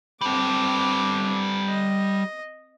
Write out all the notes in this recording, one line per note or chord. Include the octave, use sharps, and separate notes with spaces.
G3 C4 A4 D6
D#5